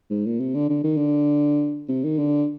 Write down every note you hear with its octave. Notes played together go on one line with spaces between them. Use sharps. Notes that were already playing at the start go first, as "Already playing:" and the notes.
G#2
A#2
C3
D3
D3
D#3
D3
C3
D#3
D3